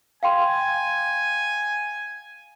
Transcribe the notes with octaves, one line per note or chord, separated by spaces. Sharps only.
F5 G5 G#5 C6